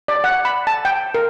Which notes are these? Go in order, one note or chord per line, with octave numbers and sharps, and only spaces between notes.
D5
F#5
B5
A5
G5
A#4